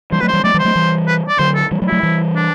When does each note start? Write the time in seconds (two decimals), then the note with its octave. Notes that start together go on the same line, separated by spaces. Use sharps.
0.12 E3 G3 C5
0.21 F#3 A3 B4
0.28 C5
0.33 E3 G3
0.44 F#3 A3 D5
0.54 E3 G3
0.59 C5
0.65 F#3 A3
0.76 E3 G3
1.08 B4
1.28 D5
1.39 D3 F#3 C5
1.55 A4
1.71 E3 G3
1.82 F#3 A3
1.87 E4
1.92 F#3 A3
2.03 E3 G3
2.35 D4